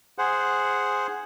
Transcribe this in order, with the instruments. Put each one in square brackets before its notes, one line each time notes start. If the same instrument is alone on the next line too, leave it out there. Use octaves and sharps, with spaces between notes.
[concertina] G#4 C5 F#5